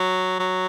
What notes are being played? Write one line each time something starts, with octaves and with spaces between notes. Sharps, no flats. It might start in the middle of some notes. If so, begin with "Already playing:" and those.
Already playing: F#3
F#3